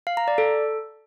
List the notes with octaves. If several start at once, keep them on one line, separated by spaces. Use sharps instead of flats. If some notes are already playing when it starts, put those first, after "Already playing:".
F5
A#5
D5
A4